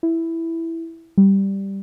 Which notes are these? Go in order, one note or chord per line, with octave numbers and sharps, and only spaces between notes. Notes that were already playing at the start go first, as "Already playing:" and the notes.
E4
G3